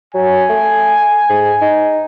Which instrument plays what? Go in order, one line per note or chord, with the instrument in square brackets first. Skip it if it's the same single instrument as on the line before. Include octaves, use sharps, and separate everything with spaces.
[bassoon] F#3 [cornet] G#5
[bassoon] A3
G#2
D#4